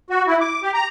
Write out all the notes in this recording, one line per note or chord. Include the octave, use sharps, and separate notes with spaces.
F#4
E4
D6
G4
A#5